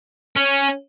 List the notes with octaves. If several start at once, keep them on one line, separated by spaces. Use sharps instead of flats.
C#4